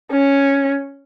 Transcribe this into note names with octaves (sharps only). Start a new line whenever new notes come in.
C#4